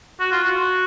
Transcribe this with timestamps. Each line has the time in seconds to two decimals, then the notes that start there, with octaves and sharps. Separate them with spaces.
0.20 F#4
0.32 F4
0.44 F#4